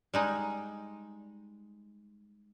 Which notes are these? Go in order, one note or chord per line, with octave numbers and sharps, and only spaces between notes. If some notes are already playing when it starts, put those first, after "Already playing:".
G3 G#3 D#4